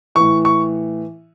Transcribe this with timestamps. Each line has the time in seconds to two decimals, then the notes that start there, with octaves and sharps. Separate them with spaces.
0.15 A2 E3 C#6
0.45 C#6